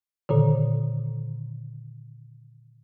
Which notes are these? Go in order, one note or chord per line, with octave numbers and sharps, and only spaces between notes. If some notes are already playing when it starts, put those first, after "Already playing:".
A#2 D3 D#3